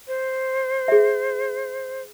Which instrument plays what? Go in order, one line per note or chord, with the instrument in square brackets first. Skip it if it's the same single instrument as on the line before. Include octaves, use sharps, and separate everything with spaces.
[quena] C5
[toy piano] G#4 E5